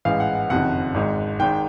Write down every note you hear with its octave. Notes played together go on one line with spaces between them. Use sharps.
A1 G#2 E3 F5
F#5
F#5
F#1 F2 C3 D#3 F#5
G#1 G#2 D#3
G#1 G#2 D#3 G5